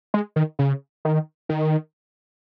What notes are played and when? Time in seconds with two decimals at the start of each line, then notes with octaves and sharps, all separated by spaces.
0.14 G#3
0.36 D#3
0.59 C#3
1.05 D#3
1.49 D#3